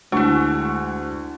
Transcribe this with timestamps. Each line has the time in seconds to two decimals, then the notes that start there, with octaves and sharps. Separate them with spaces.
0.12 D2 G#3 D4 E4 C#6